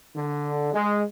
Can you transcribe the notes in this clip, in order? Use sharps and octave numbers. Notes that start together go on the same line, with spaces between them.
D3
G#3